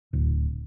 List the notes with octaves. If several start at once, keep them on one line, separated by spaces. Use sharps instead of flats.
D1